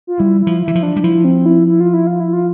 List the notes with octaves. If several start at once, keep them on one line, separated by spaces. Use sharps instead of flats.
F4
G3 E4
E4
F3
E4
E3
F3
D4
G3
F3 E4
C4
E4
E4
F4
E4
F4
E4
F4